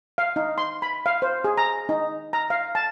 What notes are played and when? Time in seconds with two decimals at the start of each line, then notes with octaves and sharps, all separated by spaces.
0.18 F5
0.36 D#4
0.58 C6
0.82 B5
1.06 F5
1.22 C5
1.44 G#4
1.57 A#5
1.89 D#4
2.33 A#5
2.50 F5
2.75 A5